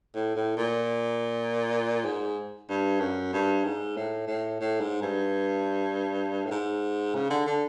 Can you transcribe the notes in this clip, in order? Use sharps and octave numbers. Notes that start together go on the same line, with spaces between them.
A2
A2
A#2
G#2
G2
F#2
G2
G#2
A2
A2
A2
G#2
G2
A2
G#2
C#3
D3
D3